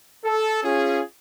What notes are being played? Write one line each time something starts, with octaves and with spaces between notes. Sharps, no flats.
A4
C#4 F4 G#4